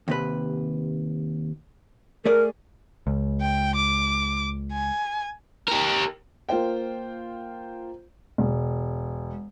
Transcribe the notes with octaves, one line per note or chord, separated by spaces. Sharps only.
D#2 C3 B4
A3 G#4 A#4 D5
C#2
G5
D6
G#5
G4 A#4
A#3 F4 C5 G5
E1